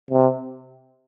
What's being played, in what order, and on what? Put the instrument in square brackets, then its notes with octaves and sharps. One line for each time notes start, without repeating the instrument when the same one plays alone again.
[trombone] C3